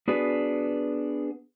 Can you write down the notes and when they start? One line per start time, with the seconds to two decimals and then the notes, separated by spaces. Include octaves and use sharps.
0.08 B3 D4 F#4 G#4 B4